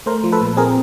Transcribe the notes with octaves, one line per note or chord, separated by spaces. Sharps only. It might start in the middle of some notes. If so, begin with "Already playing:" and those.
A3 A#4 C5
F3
A4 B4
A#2
C4 G#4 A#4